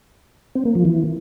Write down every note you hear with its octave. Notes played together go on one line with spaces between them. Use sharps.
C4
A#3
F3
E3